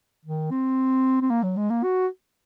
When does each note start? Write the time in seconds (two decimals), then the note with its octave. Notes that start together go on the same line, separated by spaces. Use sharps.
0.25 D#3
0.51 C4
1.21 C4
1.30 A#3
1.43 F#3
1.57 G#3
1.70 A#3
1.83 F#4